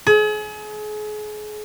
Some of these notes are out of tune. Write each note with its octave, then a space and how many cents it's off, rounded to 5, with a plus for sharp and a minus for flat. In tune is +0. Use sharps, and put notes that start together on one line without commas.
G#4 +35